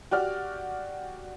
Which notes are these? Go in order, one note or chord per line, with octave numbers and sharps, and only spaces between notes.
F#4 G4 D5 F6